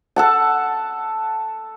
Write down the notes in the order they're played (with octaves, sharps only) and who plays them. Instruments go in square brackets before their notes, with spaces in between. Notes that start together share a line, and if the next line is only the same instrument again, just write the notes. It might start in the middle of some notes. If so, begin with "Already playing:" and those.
[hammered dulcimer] A4 F#5 A5